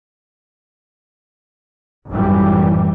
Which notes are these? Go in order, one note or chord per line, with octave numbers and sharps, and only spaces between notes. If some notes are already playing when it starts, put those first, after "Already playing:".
G#1 F#2 A2 E3 G3